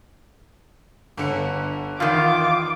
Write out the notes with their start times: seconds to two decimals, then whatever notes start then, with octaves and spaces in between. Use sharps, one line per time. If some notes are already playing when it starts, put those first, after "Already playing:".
1.17 G1 D3 C#7
2.00 E2 D#3 F4 F5 D6 D#6